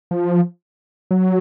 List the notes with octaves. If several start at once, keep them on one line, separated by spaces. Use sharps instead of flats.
F3
F#3